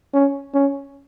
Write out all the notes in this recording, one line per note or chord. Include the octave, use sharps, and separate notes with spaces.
C#4
C#4